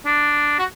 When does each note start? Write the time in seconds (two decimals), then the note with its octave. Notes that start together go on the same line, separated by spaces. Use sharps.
0.06 D4
0.59 F#4